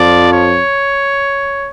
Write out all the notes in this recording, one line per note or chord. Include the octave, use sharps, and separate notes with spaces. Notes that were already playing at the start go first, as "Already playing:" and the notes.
Already playing: F2 F3 D5
C#5